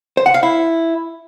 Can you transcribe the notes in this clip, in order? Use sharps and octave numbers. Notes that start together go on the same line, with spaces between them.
C5
F#5
F5
E4